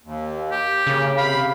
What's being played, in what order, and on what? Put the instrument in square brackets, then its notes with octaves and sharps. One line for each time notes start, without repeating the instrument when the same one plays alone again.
[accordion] D#2
[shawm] G4
[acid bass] C#3 [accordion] A#3
[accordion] C3 [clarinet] F5 [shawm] B5